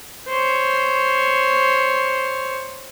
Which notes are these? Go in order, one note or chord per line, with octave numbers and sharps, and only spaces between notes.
C5 C#5